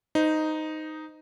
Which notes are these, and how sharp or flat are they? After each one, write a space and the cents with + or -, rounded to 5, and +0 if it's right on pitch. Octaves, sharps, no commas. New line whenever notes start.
D#4 +0 C5 -25